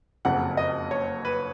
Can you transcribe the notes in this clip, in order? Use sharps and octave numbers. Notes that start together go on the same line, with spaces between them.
F#1 F2 C#3 F#5
D#5
C#5
B4